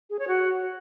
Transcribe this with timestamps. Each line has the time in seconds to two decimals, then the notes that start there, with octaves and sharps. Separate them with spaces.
0.10 G#4
0.19 C#5
0.28 F#4